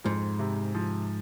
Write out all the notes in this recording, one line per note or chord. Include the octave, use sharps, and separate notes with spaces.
F2 G#2
C3
F3